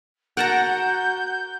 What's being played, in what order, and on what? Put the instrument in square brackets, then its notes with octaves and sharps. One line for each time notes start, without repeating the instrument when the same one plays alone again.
[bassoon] F#4 [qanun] A#4 A5 A#5 [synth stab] F#5 [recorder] G6